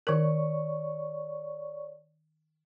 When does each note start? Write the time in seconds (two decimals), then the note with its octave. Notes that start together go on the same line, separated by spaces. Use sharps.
0.07 D#3 A#4 C#5 D5 C#6